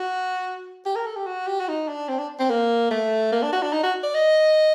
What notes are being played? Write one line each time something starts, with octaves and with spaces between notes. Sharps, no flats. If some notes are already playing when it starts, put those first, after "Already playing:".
Already playing: F#4
G4
A#4
A4
G4
F#4
G4
F#4
D#4
D4
C4
D4
C4
A#3
A3
A#3
D4
F#4
D4
D#4
F#4
D5
D#5